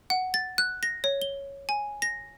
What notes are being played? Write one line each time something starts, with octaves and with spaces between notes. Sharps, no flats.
F#5
A6
F#6
A#6
C#5
G7
G#5
A#6